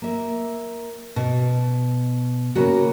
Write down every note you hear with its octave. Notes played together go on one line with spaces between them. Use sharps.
A#3 E5
B2
C#3 A#3 F#4